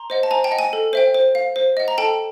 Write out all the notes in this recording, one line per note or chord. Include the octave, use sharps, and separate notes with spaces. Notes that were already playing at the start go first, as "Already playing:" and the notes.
Already playing: A#5 C6
C5 D#5 F#5
A5
C5 G#5 A#5
G5 A5
D#5 F#5
G#5
A4
C5 E5 G5
C5
F5
C5
D#5 F#5
A#5
A4 G5 A5